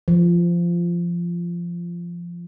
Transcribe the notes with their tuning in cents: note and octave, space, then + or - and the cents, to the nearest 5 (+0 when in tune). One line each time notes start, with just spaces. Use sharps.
F3 -15